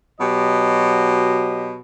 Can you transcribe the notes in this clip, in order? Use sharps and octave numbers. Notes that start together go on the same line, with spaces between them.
B2 F#3 G4 D#5